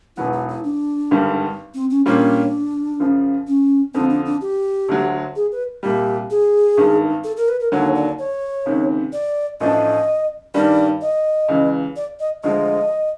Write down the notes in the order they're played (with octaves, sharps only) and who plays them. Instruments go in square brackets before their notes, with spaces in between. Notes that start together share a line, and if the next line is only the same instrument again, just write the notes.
[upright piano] E1 E2 B2 F#3 B3 [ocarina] E4
[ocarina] E4
E4
D4
[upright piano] G#1 G2 D3 G3
[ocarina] C4
C#4
[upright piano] A#2 G3 A#3 C#4 F4 [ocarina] D4
[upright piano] F#2 C#3 F3
[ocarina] C#4
[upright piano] F2 D3 F3 [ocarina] C4
[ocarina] D4
D4
G4
[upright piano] D2 D3 F#3
[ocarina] G#4
B4
[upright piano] C2 A#2 G3 [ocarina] G4
[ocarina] G#4
[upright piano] G#1 G2 D#3
[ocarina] A4
A#4
B4
A#4
[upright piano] D#2 D3 F#3 [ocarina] C#5
[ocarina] D5
C#5
[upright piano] C#2 C3 D#3
[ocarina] D5
[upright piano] A1 A2 F3 A3 D4 [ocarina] D#5
[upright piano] G2 D#3 G3 [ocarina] D5
[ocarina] D#5
[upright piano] C#2 C#3 E3
[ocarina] D5
D#5
[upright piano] D2 D3 F3 G#3 [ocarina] D#5